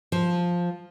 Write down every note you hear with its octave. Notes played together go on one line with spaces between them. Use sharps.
F3